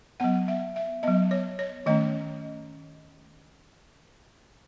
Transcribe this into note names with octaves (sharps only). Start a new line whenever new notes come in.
F#3 B3 F#5
E5
E5
F#3 B3 D#5
C#5
C#5
D#3 A3 C#4 D#5